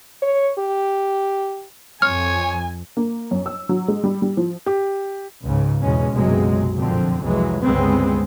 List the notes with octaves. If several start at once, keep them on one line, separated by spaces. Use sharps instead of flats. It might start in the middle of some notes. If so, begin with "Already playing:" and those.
C#5
G4
F2 C#5 G#5 F6
A#3
F#2
E6
F#3
G#3
G3
G3
F3
G4
C#2 G#2 C#3
E2 B2 G#3 C#4
F#1 B1 C3 F#3 G#3
F2 A#2 D3 F3 C4
C2 F2 E3 F#3 G#3
G1 C#2 C#3 G#3 B3 C4